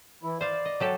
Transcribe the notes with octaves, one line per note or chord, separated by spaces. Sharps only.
E3 E4
C5 D5 F5
D#5
F#3 G4 A4